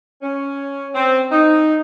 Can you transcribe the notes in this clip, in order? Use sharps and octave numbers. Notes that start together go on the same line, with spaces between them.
C#4
C4
D#4